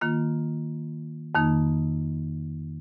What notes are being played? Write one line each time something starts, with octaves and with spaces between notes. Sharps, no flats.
D#3 A#3 F4
F2 D#3 A#3 D#4